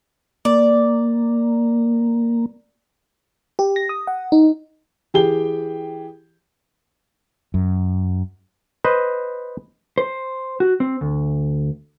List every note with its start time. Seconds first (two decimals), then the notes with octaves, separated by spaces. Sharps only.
0.45 A#3 D5
3.59 G4
3.76 A#6
3.89 D#6
4.07 F#5
4.32 D#4
5.14 E3 G4 G#4 G5 G7
7.54 F#2
8.85 B4 C5 D#5
9.98 C5
10.60 F#4
10.80 C4
11.01 D2